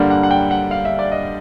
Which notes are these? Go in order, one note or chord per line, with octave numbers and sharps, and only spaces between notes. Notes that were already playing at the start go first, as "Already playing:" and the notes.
Already playing: G2 D3 G3 A#3 F#5
F#5
F#5
G5
F#5
F5
E5
D5
D#5